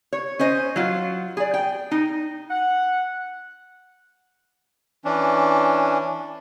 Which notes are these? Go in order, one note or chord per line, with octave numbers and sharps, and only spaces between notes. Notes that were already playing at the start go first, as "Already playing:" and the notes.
C#5
C#4 C5 D#5
F#3 F4
G#4 D5
G5
D#4
F#5
E3 C#4 D4